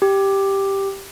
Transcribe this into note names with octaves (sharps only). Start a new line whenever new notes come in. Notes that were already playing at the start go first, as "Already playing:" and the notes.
G4